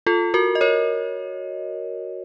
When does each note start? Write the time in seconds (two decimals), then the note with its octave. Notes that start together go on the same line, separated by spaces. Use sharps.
0.07 F4 A4
0.34 F#4 A#4
0.55 D#5
0.61 A#4 C#5